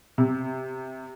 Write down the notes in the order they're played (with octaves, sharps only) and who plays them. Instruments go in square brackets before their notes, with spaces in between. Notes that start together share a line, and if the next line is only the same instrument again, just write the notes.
[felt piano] C3